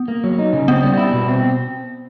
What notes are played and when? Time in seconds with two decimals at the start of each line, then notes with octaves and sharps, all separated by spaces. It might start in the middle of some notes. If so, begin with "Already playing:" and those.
Already playing: B3
0.08 A#3
0.24 F#3
0.38 D#4
0.53 C#3
0.68 B3 C4
0.83 G3
0.97 E4
1.13 B2
1.28 C4